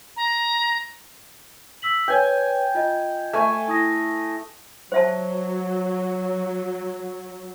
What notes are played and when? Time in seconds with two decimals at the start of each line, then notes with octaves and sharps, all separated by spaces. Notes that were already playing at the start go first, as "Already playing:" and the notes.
0.16 A#5
1.82 E6 B6 F#7
2.08 B4 C#5 G5 G#5
2.75 F4 D#5
3.33 A3 G#5
3.68 E4 D#6 A#6
4.92 F#3 C5 E5 A5